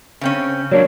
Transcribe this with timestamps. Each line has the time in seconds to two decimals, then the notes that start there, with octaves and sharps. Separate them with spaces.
0.21 C#3 C4 C#4
0.71 F#3 A#3 D4 C#5